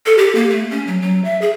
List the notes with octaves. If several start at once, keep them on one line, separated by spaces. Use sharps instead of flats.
A4
G4
A#3
A3
C#4
F#3
F#3
E5
G#4